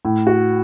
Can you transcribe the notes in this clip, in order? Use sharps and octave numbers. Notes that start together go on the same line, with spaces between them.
A2
F#4